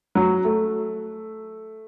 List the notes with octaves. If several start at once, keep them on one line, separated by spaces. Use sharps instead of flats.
F#3
A3